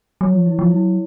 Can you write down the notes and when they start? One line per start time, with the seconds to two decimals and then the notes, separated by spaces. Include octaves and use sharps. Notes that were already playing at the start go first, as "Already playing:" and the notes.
0.21 F#3 C#5
0.34 F3
0.46 E3 E4
0.59 F3
0.71 F#3 E4